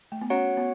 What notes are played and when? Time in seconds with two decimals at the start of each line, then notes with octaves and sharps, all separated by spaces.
0.12 A3
0.21 B3
0.30 C#4 F#4 C#5 F#5
0.57 B3